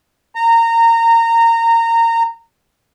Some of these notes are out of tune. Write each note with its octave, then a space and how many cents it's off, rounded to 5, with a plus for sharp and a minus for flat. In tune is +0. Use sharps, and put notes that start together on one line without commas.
A#5 -20